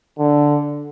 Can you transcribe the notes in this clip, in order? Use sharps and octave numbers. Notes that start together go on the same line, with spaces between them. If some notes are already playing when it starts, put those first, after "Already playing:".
D3